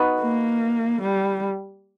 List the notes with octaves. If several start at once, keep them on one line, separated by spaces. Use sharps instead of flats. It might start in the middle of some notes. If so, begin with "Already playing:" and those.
Already playing: B3 D#4 F#4 B4
A#3
G3